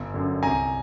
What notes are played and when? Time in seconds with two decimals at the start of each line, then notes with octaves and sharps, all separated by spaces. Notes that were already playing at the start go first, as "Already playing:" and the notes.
Already playing: G1
0.14 F#2 D3
0.43 C2 G#5 A#5